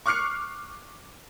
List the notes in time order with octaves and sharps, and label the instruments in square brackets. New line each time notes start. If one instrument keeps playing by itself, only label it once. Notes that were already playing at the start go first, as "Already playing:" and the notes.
[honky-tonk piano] C#6 D6 F6 F#6 C7 C#7